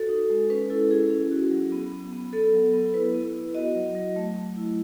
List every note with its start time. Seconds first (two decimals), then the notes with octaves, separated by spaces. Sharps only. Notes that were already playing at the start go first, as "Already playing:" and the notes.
Already playing: F#4 A4
0.09 D#4
0.30 G#3
0.50 C#4 B4
0.70 E4 A4
0.91 E4 G#4
1.10 C#4
1.31 F#4
1.51 F#3
1.72 B3
1.92 B3
2.12 B3
2.33 B3 A4
2.52 F#3
2.74 B3
2.94 E4 B4
3.14 B3
3.35 E4
3.55 F#4 D#5
3.75 F#3
3.95 F#3
4.16 A3
4.36 A3
4.56 E4